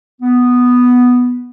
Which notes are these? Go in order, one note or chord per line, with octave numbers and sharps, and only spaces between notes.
B3